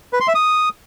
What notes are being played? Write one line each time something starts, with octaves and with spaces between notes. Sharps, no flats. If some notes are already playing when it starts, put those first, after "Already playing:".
B4
C6
E5
D#6